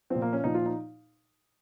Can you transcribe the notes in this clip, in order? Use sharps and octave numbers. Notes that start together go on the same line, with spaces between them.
A#2 F3 C4
A#3
C#4
A#2 F3 D#4
F4
D#4